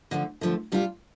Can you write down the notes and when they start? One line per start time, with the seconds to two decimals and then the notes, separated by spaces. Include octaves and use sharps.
0.11 D3 F3 A3
0.41 D3 F3 A3
0.72 C3 G3 D4 F4